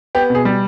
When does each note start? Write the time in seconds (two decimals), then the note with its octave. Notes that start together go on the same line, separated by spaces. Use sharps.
0.15 B3 G4
0.30 B2
0.35 G#4
0.45 G3